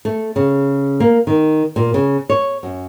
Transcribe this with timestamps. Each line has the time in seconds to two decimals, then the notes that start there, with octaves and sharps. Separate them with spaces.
0.05 A3
0.36 C#3
1.00 A#3
1.27 D#3
1.76 A#2
1.94 C#3
2.29 C#5
2.63 F#2